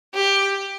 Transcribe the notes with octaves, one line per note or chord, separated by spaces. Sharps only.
G4